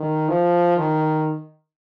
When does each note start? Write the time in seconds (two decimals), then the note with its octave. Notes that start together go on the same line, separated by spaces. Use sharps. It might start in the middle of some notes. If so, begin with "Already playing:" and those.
Already playing: D#3
0.28 F3
0.77 D#3